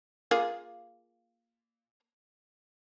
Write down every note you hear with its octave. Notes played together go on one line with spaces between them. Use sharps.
A#3 F4 G#4